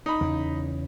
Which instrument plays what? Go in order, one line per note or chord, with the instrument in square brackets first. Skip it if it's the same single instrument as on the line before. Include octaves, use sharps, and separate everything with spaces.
[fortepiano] D#4 B5
[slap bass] E2 C#3